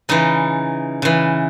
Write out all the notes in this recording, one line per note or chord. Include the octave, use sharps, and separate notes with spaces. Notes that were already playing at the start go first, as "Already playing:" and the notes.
C#3 E3 D#4
C#3 E3